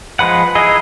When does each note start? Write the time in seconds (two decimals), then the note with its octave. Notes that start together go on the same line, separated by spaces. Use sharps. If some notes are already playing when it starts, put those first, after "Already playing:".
0.19 F3 G#3 B4 F#5
0.55 D#4 E4 G#4 D#5